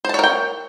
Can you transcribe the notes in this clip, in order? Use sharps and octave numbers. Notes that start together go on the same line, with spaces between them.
A#4 C5 C#5 G5 A5